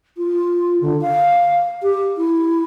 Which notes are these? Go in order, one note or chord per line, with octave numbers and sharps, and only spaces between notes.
F4
D3
F5
G4
E4